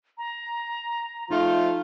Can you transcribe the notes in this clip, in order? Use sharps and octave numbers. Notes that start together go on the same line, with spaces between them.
A#5
F3 A3 D#4 F4